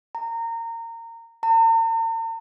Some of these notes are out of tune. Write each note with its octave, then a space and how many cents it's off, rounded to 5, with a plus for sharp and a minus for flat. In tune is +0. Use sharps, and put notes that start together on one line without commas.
A#5 -25
A#5 -45